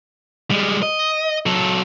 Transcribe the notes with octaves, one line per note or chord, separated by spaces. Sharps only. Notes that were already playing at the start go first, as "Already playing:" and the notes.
G3 G#3
D#5
F#3 A4